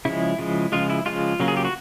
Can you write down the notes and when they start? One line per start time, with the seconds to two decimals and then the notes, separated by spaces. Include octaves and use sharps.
0.05 C#3 F3 G#3 E4
0.39 C#3 F3 G#3
0.72 C#3 F3 G#3 F4
0.90 E4
1.06 C#3 F3 G#3 F4
1.40 C#3 F#3 A#3
1.48 G#4
1.57 G4
1.65 F#4